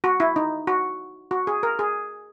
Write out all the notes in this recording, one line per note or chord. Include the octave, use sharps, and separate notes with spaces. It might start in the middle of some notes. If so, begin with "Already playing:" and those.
F#4
E4
D#4
F#4
F#4
G#4
A#4
G#4